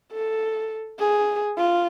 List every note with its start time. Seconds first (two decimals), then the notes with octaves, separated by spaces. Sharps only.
0.12 A4
0.99 G#4
1.58 F4